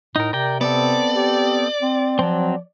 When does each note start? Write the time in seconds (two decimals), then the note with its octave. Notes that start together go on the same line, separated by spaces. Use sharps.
0.16 A2 D#4 A#4
0.33 C3 A#4 D5 G5
0.61 B3 C4 A4 D5
1.15 G4
1.82 C4
2.19 F3 F#3 C4